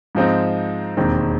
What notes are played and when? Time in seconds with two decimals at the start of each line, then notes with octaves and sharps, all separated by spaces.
0.15 G#2 F3 G#3 C4 D#4
0.97 E1 D#2 D#3 G#3 C4